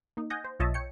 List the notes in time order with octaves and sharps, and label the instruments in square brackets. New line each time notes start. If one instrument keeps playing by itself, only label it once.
[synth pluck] A#3 D#4
D#5 F#5 G#5 D#6 G6 A#6
C5
B1 F4 C#5 D#5 E5 A5
C#5 G5 C#7